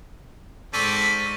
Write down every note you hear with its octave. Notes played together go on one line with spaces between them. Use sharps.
G#2 C4 A4 D5 C#6 F6 B6 D#7